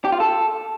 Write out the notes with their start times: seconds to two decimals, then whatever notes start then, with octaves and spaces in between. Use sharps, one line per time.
0.05 G4
0.12 F4
0.20 A4